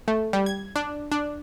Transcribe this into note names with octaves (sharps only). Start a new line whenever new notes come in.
A3
G3
G#6
D4
D4